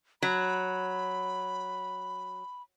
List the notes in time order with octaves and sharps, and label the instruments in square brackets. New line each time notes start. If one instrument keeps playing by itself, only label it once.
[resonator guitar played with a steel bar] F#3 [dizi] B5